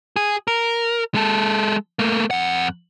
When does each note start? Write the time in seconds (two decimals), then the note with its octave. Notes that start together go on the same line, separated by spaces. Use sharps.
0.16 G#4
0.48 A#4
1.14 G#3 A4
1.99 A3 A#3
2.31 F2 F#5